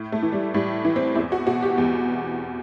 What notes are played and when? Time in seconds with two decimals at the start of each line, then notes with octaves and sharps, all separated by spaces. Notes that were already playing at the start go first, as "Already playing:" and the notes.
Already playing: A2
0.12 A3
0.23 E3
0.32 G3
0.54 A2 G3
0.85 E3
0.96 C4
1.15 E2 E4
1.32 F#4
1.47 B2 F#4
1.62 G4
1.78 E2 G4